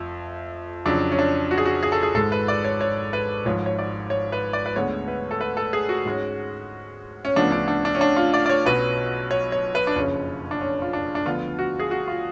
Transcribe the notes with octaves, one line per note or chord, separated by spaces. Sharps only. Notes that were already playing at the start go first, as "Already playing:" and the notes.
Already playing: F2 F3 A3
F2 C#3 F#3 D4
C#4
D4
F#4
G#4
F#4
G#4
A4
G#4
G#1 G#2 G#3 A4
B4
D5
C#5
C#5
B4
G#1 G#2 F3 C#5
C#5
D5
C#5
B4
D5
B4
D2 D3 G#3 B3 C#5
B4
A4
B4
A4
G#4
F#4
G#2 G#3 C#4
C#4
D2 C#3 F3 B3 D4
D4
D4
D4
C#4
D4
F4
D5
D5
C#5
B1 B2 F#3 C#4 B4
C#5
C#5
B4
D4
F#1 F2 C#3 C#4
D4
C#4
F4
D4
D4
D2 D3 F3 B3 F4
F#4
G#4
F#4
F4